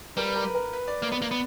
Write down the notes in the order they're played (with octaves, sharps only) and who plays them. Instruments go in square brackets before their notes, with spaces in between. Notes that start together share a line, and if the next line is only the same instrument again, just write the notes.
[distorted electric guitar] G3 [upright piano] A#4
[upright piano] B4
A#4
B4
A#4
B4
D5
[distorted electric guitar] A#3
B3
A#3
B3